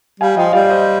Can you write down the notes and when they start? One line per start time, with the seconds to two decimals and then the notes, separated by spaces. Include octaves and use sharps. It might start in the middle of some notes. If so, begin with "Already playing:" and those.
0.20 G3 F5 G#5
0.37 F3 D#5 G5
0.53 G3 D5 F5
0.69 C5 D#5